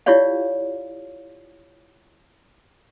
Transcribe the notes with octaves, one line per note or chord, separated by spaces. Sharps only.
E4 F4 G4 C#5 D5 F5